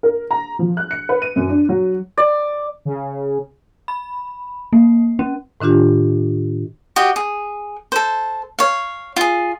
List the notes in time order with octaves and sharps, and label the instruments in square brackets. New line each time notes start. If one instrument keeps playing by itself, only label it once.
[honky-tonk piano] A#4
A#5
F3
F#6
C#7
B4
D#7
F#2
D4
F#3
[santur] D5
[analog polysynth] C#3
[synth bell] B5
A#3
C#4
[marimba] A2 D#3 D4 F4 G4
[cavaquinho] F#4 G4 D#5
G#4
A4 C5
C#5 F5
F4 G#4